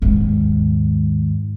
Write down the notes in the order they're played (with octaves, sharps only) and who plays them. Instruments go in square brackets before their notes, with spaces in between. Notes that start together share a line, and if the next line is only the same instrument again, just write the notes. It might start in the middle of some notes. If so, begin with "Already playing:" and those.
[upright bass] D#2 G#2